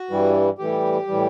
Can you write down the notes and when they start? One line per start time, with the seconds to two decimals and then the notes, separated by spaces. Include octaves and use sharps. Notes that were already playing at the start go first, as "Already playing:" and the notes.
Already playing: F#4
0.10 G2 E3 G3
0.58 A2 E3 G3 G4
1.07 A2 E3 G3